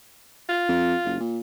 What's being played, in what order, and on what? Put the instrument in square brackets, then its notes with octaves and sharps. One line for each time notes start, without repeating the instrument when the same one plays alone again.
[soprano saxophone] F4
[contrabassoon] F2
F#1
A#2